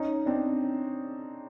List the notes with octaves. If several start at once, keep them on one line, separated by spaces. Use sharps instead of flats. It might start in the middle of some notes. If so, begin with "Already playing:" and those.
Already playing: C#4 D#4
C4 D4